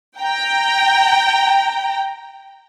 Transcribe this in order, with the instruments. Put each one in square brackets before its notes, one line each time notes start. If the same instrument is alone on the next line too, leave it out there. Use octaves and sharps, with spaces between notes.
[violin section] G5 A#5